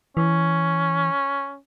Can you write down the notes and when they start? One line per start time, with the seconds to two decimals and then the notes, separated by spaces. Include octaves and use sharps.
0.17 E3 C#4